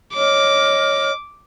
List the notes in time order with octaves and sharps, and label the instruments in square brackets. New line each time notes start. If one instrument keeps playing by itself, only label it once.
[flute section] C#5 D#5 F6 [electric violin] D6